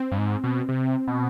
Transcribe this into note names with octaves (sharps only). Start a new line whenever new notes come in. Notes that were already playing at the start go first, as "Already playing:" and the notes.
Already playing: C4
G2
G#2
B2
C3
B2